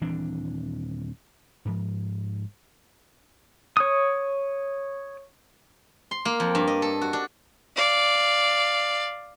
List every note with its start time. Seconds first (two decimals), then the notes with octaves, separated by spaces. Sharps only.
0.01 D#1 E3 C4 D4
1.65 G#2 F3
3.77 C#5 D#6
6.11 C6
6.25 A#3
6.40 F2
6.55 G2
6.67 D#5
6.82 A4
7.01 F#4
7.13 D4
7.76 D5 F5